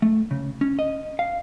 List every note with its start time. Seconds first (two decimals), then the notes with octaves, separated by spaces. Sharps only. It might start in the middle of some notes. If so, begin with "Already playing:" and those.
0.02 A3
0.31 C#3
0.61 C#4
0.79 D#5
1.19 F5